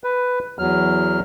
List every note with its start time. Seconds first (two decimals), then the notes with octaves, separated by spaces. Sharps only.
0.04 B4
0.59 E2 F#3 F6